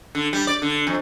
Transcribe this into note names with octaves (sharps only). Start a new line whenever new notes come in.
D3
G3
D5
D3
F2